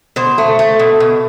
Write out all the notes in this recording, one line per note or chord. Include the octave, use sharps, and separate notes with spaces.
B2 C5
A3
A3
B2
B2